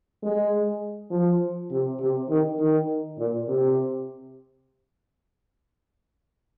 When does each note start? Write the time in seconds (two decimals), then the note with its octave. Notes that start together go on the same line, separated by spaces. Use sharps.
0.23 G#3
1.11 F3
1.71 C3
2.00 C3
2.29 D#3
2.59 D#3
3.18 A#2
3.48 C3